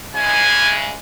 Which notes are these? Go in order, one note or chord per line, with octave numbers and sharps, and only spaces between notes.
C#3 E3 G#3 G#5